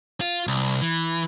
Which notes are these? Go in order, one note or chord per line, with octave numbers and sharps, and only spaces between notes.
F4
C2
E3